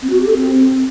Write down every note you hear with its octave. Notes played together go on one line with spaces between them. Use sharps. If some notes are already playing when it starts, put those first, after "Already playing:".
C4
F#4
G4
A4
C4